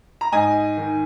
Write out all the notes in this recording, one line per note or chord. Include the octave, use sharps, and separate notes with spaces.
A#5
G#2 D#5 G#5
D#3